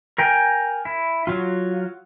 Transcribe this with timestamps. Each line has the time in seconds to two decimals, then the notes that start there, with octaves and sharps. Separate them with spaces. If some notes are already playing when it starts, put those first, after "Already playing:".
0.18 A#4 G5 G#5
0.85 E4
1.27 F#3 F4